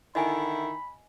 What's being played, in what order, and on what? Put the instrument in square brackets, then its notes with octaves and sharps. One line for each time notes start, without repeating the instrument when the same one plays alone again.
[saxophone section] D3 D#3 E4 [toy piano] D#5 G#5 [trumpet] B5